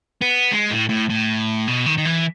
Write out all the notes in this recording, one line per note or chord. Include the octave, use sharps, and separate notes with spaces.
B3
G#3
A2
A2
A2
B2
D#3
D#3
E3